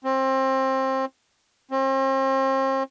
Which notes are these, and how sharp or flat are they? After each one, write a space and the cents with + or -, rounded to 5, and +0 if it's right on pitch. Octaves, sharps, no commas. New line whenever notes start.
C4 +25
C4 +40